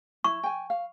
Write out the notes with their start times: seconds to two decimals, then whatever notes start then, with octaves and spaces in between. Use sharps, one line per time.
0.24 E4 C#6
0.43 G5 G#5
0.70 F5